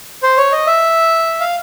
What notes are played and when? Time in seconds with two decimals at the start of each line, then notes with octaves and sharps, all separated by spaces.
0.23 C5
0.37 C#5
0.52 D#5
0.67 E5
1.40 F5